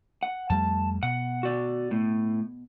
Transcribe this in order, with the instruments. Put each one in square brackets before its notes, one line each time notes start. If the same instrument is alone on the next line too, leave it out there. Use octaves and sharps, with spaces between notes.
[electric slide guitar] F#5
[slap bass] F2 G3 A3 [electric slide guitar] A5
[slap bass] B2 [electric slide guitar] F#5
[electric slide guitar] F#4 D5
A2